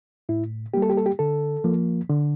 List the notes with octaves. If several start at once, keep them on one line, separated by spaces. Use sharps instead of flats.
A2 E4
G3 A#3 G4
A4
G4
A4
G4
D3 A4
F3 A#3
D3